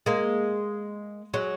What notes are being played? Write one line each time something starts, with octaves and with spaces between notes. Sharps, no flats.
G#3 A#3
F#3 G#3